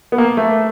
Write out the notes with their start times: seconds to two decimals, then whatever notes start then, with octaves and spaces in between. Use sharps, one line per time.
0.12 B3
0.18 A#3
0.37 A3